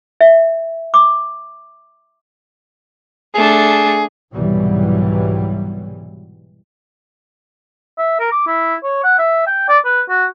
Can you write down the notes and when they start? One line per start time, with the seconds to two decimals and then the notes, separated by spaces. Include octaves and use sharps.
0.21 E5
0.94 D6
3.35 A3 D4 G#4
4.33 C2 G#2 B2 E3 F#3 G3
7.98 E5
8.20 A#4
8.32 D6
8.47 E4
8.84 C#5
9.04 F#5
9.19 E5
9.47 G5
9.68 D5
9.85 B4
10.09 F#4